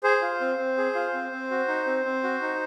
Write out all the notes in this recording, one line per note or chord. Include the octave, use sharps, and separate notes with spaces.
G#4 C5
F4
C4
C4
G#4
F4
C4
C4
F#4
D#4
C4
C4
F#4
D#4